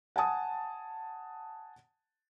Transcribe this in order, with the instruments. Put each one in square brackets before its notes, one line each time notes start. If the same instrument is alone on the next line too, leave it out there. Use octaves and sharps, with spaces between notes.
[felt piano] F#5 G#5 A5 D#6